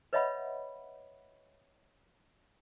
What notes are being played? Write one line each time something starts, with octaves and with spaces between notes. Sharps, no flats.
B4 C#5 D#5 E5 F#5 B5